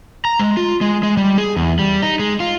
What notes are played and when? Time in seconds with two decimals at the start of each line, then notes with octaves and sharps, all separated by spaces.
0.25 A#5
0.39 G#3
0.57 F4
0.81 G#3
1.03 G#3
1.17 G3
1.38 G#4
1.56 E2
1.79 G3
2.02 D#4
2.19 G#3
2.40 F4